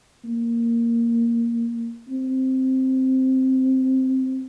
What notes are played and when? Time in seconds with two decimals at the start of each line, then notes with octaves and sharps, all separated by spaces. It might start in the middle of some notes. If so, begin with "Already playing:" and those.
0.24 A#3
2.09 C4